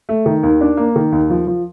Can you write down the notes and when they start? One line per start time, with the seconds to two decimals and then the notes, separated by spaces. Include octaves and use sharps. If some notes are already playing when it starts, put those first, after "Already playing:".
0.09 A3
0.26 D#3
0.43 D#2
0.61 D4
0.77 A#3
0.96 D#3
1.12 D#2
1.30 F3
1.47 F3